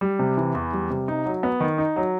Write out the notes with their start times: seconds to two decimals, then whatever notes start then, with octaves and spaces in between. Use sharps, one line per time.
0.01 G3
0.19 C3
0.37 E3
0.55 E2
0.73 G3
0.90 C3
1.08 D#4
1.26 F#3
1.43 B3
1.60 D#3
1.78 D#4
1.96 F#3